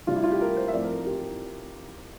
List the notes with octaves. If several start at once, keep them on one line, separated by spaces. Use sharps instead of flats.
C3 G3 D4 F4
E4
F4
G4
A#4
C5
E5
A2 F3 C4 D5
A#4
A#4
G4